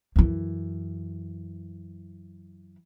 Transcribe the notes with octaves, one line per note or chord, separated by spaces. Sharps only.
F#2 E3